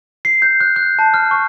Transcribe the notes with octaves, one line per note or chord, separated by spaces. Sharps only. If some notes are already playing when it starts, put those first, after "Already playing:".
C7
G6
F#6
F#6
A5
F6
C#6